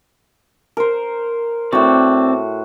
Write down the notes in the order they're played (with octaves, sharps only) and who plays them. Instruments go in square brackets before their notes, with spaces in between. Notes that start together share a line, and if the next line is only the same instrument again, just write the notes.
[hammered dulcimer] A#4 C5
[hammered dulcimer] A2 F#4 [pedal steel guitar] C4 D5